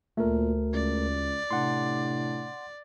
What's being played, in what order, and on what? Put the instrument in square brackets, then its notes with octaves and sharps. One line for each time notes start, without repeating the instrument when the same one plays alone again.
[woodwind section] D2 [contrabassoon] A#2 [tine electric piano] A3 A#4
[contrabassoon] C#2 [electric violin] D5
[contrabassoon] A2 [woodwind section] C3 D4 [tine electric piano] F#5 C6